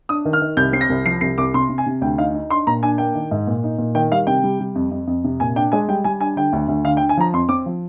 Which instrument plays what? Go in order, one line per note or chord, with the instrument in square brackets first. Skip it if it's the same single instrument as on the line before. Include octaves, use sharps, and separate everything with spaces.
[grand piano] D4 D#6
D#3
F6
D#3
C2 G6
C4 C7
A#6
C2
F3 C7
C2 C7
C2 D6
C3 C6
C3
G#5
C3
D2 G5
D#4 F5
D#4
D4 C6
A#2 A#5
D4 G#5
A#3 G5
D#3
G#2
A#2
D#4
A#2
D#3 G5
G3 F5
C3 G5
G3
G3
F2
F2
F2
C3
A#2 G#5
D4 G5
G#3 G#5
G3 G5
G3 G#5
D4 G#5
D3 G5
D2
D2
D3 F5
G5
D3
G#5
F3 A#5
F2 C6
C4 D6
F3